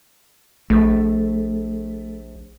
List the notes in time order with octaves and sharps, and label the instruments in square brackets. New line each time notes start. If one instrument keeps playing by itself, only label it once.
[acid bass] A#1 [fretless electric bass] A3